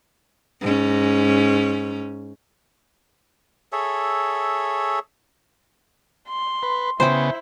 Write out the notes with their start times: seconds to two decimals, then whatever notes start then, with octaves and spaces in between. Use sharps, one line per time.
0.62 G#2 C#4
3.72 G#4 A4 C#5 E5
6.29 C6
6.63 B4
7.00 C#3 B3 E4 C5 G5